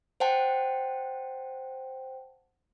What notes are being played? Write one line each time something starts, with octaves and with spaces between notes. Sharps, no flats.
C5 F#5 G5 A5